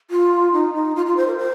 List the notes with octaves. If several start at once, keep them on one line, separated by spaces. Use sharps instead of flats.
F4
D#4
D#4
F4
F4
C5
A#4
C5